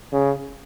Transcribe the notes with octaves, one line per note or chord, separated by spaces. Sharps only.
C#3